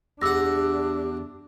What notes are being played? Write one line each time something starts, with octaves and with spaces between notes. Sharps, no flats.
E2 D4 G4 F#5 D6 E6 A#6